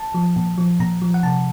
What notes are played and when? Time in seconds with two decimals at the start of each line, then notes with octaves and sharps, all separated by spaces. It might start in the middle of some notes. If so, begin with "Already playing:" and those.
Already playing: A5
0.14 F3
0.36 A#2
0.58 F3
0.80 A#2 A#5
1.02 F3
1.14 F#5
1.23 C3 A5